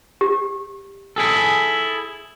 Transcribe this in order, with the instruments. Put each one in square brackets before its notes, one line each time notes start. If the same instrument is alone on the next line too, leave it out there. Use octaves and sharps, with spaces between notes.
[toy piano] G4
[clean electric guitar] E4 G#4 A4